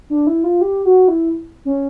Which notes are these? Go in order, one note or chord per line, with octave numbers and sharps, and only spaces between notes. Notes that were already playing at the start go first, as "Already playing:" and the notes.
D4
E4
F4
G4
F#4
E4
C#4